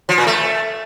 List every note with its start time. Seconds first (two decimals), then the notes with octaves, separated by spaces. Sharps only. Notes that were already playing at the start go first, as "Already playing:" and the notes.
0.09 F3
0.18 A#2
0.27 A3